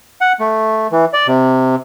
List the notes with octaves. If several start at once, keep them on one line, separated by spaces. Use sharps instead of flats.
F#5
A3
E3
D5
C3